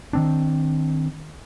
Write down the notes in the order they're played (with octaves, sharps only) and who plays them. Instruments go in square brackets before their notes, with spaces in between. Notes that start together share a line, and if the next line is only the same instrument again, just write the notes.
[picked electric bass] D#3 C4 D4